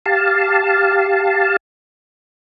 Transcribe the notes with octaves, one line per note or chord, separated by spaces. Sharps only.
G4 F5 A5